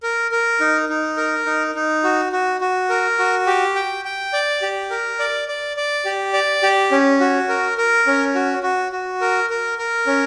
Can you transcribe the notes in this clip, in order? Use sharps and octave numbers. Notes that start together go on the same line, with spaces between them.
A#4
A#4
D#4
D#4
A#4
D#4
D#4
F#4
F#4
F#4
A#4
F#4
G4
G5
G5
D5
G4
A#4
D5
D5
D5
G4
D5
G4
C#4
F#4
A#4
A#4
C#4
F#4
F#4
F#4
A#4
A#4
A#4
C#4